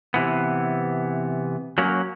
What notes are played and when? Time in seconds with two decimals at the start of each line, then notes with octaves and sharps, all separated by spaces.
0.14 C3 E3 B3
1.78 F#3 A#3 C#4